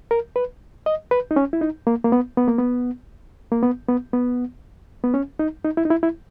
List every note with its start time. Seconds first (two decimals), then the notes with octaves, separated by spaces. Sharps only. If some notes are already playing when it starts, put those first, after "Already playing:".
0.11 A#4
0.36 B4
0.86 D#5
1.11 B4
1.31 D#4
1.36 C#4
1.53 E4
1.61 D#4
1.87 A#3
2.05 A#3
2.12 B3
2.37 B3
2.48 A#3
2.58 B3
3.52 A#3
3.63 B3
3.89 B3
4.13 B3
5.04 B3
5.14 C#4
5.39 D#4
5.65 D#4
5.77 E4
5.85 D#4
5.90 E4
6.03 E4